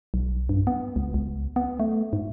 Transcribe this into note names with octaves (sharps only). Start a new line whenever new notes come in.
B1
G2
B3
C#2
C#2
B3
A3
G#2